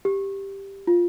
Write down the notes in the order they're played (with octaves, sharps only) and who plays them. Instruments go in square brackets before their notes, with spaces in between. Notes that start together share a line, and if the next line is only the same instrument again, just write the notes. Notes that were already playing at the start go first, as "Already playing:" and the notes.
[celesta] G4
F4